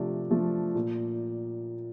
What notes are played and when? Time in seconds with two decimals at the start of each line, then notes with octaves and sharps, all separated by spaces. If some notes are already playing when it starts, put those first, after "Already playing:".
Already playing: C3 F3 A3 D4 D5
0.31 F3 A3 D4
0.75 A#2